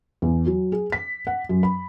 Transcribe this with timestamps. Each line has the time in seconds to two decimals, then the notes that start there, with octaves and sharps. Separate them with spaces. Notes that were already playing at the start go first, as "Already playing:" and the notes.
0.22 E2
0.46 F#3
0.72 G#4
0.92 B6
1.27 F#5
1.49 F#2
1.63 B5